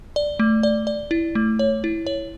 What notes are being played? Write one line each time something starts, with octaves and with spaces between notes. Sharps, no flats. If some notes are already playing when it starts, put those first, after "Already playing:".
D5
A3
D5
D5
E4
A3
C#5
E4
C#5